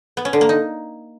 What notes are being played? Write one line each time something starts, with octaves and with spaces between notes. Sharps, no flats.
B3
C#4
D3
A#3
D#4